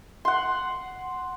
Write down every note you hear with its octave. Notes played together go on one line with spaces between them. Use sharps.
F#5 C6